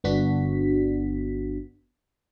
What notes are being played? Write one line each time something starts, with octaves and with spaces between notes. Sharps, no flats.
G1 B3 D4 F#4 B6